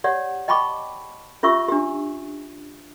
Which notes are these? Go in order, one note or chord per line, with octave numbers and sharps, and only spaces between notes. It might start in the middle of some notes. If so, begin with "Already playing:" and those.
G4 C#5 D5 F#5
D#5 G5 A5 B5 C#6 D6
C#4 F4 G4 E5 C#6 E6
D4 G4